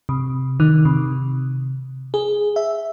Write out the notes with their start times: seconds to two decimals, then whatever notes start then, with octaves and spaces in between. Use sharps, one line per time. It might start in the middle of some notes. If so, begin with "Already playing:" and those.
0.09 C3
0.60 D#3
0.85 C3
2.14 G#4
2.56 E5